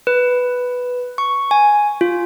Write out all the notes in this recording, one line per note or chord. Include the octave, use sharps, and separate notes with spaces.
B4
C#6
G#5
F4